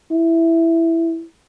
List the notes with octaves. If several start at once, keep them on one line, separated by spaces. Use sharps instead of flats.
E4